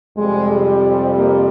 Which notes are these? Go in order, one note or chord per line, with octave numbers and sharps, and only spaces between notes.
F2 C3 G3 G#3
A#3